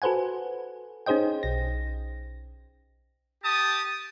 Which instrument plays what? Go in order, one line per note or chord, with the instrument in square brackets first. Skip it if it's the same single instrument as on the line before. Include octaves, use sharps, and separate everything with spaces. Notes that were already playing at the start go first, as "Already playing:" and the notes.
[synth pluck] F#4 A4 B4 C5 F#5 G#5
C#4 D#4 G#4 C5 D#5 G5
B1 A#6
[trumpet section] G4 A5 D#6